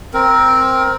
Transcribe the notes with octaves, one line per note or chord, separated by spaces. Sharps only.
C4 A#4